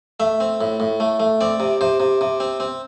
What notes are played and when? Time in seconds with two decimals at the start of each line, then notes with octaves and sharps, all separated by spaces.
0.20 A3 E5
0.40 C4
0.61 A2
0.80 A2
1.00 A3
1.20 A3
1.41 C4 D5
1.60 C3
1.81 C3 C5
2.00 C3
2.21 C3
2.40 C4
2.60 C4